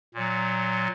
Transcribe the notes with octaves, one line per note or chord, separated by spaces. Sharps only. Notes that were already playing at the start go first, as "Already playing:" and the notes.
A#2 F#3